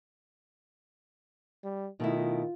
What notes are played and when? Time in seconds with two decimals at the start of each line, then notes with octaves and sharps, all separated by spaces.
1.64 G3
2.00 B2 D#3 A3 E4 F4